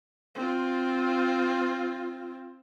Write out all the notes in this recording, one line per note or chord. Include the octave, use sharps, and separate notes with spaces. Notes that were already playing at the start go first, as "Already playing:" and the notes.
C4 F4